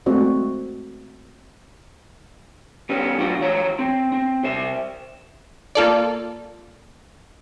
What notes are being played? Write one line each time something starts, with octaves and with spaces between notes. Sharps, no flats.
G#3 A3 C4 F#4 C5 D5
G3 B3 C#4
A#2 F#3 D4 F4 F#5
E3 F3 C#5 A#5
C4
C4
C2 C5 E5
A#3 F4 A4 D5